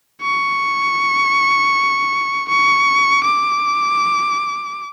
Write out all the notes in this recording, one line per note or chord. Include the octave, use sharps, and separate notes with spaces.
C#6
C#6
D6